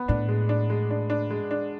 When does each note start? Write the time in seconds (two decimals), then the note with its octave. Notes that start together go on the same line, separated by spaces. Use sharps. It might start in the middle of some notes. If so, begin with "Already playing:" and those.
Already playing: B3
0.08 A2 D4
0.28 G#3
0.49 D4
0.70 G#3
0.91 D4
1.10 D4
1.30 G#3
1.51 D4